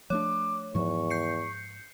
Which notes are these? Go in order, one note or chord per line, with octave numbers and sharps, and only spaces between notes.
F3 A3 D4 C#5 D6
E2 G#2 F3 C#6
G6 C7 C#7